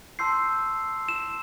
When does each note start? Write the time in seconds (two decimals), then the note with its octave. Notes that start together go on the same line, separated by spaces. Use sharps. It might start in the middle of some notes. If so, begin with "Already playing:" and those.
0.19 A5 C6 E6 G6 C7
1.09 E7